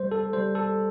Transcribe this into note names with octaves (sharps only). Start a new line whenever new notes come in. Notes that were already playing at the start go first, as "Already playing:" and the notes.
Already playing: G3 C5
A4
G3 C5
A4